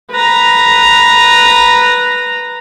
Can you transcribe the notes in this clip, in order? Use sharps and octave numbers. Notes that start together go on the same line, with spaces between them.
B4 A#5